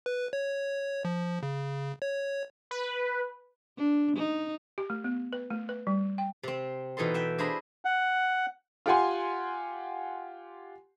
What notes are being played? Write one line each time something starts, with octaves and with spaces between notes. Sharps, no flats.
B4
C#5
F3
C#3
C#5
B4
D4
D#4
G4
A3
B3
B4
A3
B4
G3
G5
C3 C4
B2 E3 D#4 A4 C6
E5 G5
D4 E4 G#4 C5 A#5 B5
F#5
F4 G4 F#5 G#5 C6